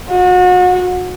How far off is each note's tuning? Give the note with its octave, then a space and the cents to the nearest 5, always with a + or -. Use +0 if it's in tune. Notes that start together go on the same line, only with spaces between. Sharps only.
F#4 -35